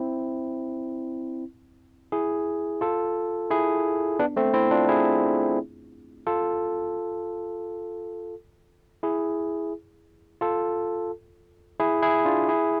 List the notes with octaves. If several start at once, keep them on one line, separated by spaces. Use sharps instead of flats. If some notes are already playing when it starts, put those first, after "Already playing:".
Already playing: C4 E4
E4 G#4
F4 A4
E4 G#4
B3 D4
A3 C4
C4 E4
D4 F4
E4 G#4
F4 A4
E4 G#4
F4 A4
E4 G#4
E4 G#4
D4 F4
E4 G#4